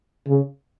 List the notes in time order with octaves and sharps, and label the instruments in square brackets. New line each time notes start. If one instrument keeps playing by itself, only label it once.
[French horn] C#3